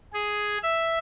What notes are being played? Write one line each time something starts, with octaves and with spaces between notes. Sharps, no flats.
G#4
E5